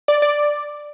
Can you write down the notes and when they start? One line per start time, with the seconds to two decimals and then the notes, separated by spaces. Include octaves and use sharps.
0.08 D5
0.22 D5